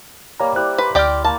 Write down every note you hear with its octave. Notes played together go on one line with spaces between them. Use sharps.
G3 A#3 C#5 A#5
E4 G4 C5 D5 F#6
B4 B5 C6
D2 G4 D5 G5 F6
A#3 A5